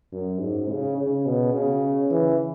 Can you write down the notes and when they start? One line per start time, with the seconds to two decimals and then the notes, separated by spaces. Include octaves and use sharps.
0.13 F#2
0.41 G#2
0.70 C#3
0.98 C#3
1.26 B2
1.54 C#3
2.11 E3